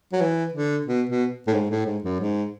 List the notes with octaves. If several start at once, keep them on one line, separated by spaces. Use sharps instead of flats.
F#3
E3
D3
B2
B2
A2
G#2
A2
G#2
F#2
G#2